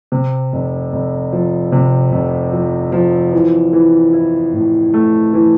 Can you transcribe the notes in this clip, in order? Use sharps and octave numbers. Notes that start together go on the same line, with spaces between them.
C3
F1
F1
F3
C3
F1
F3
F3
E3
E3
E4
A2
A3
E3